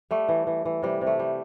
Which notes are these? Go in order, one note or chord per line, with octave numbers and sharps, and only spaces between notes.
G3 A3
E3
E3
E3
C3 G3
C3
A3
G3